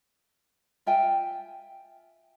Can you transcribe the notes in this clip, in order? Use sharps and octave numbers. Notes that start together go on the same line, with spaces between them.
F4 E5 G5 G#5